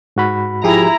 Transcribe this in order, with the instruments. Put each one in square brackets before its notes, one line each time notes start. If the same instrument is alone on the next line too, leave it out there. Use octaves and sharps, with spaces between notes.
[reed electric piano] G#2 F#4 B5
[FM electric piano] F3 G4 G#4 [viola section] E4 A#5